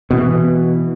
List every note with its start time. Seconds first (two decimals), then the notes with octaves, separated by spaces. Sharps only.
0.10 B2 E3